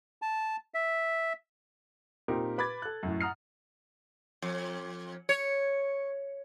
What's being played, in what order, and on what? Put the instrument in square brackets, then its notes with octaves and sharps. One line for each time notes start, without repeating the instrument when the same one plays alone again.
[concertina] A5
E5
[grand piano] A#2 C4 D#4 G4 A#4
B4 B5 D6 G#6 A6
A4 F#6
F#2 A2
F#5 A#5 D#6 F6 C7
[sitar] F2
C#5